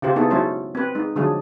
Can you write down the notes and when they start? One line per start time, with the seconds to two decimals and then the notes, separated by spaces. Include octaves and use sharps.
0.02 C#3 F4 G4 C5
0.16 B3 D#4 E4 G#4 A4
0.31 F#3 G#3 C#4 E4 A4 C5
0.75 C4 B4
0.95 G#3 D#4
1.16 D3 F3 F#3 G#3 D4 G#4